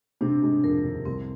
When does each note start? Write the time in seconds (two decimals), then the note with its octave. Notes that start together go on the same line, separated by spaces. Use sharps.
0.21 C3 C4 D4
0.42 G#2 G#3
0.64 F2 F3 A#4
0.84 D#2 D#3
1.05 C2 C3 C4